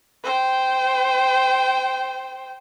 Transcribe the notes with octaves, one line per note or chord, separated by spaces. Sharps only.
C5 G5